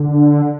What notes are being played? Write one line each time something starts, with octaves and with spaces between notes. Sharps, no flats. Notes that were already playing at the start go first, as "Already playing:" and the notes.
Already playing: D3